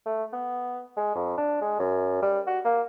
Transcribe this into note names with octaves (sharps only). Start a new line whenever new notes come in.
A3
B3
G#3
F2
D4
G#3
F#2
G3
F#4
A#3